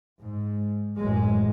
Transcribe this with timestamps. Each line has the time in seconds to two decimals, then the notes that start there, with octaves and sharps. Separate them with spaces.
0.21 G#2
0.97 A1 F#2 G#3